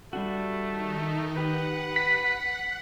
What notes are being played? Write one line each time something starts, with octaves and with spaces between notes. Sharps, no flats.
G3 A3 D4 F#4
D#3 D#4
G4 B4 F#5
B6